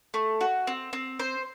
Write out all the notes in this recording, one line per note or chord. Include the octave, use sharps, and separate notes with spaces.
A3
F#4
C4
C4
C5